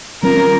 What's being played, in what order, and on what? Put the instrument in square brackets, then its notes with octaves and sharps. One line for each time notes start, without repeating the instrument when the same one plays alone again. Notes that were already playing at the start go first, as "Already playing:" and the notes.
[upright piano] D#3 G3 C#4 F4 [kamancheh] A#4